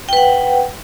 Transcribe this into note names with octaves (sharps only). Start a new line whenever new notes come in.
B4 F#5 G5